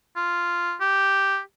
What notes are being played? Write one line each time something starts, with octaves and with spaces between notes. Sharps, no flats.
F4
G4